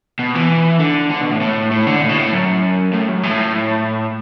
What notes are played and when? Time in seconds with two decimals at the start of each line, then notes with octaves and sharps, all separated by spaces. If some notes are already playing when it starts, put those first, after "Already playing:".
0.19 B2
0.35 E3
0.80 D3
1.11 D3
1.21 B2
1.31 A2
1.41 A2
1.71 A2
1.87 D3
2.02 A2
2.09 B2
2.17 A2
2.33 F#2
2.93 A2
3.08 F#2
3.23 A2